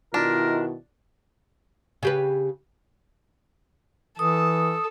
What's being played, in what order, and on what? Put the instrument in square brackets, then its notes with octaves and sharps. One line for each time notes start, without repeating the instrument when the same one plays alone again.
[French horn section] B2 D#3 E4 [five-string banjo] D4 [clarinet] F4 [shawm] A#4
[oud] C#3 G4 B4
[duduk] E3 [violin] A4 [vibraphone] D#6